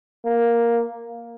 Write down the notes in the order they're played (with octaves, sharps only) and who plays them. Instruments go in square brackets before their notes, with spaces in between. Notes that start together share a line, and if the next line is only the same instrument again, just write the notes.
[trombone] A#3